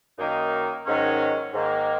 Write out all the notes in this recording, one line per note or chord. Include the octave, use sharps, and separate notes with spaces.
F#2 D#3 A#3 D#4
G#2 D#3 F#3 C#4
G#2 D#3 A#3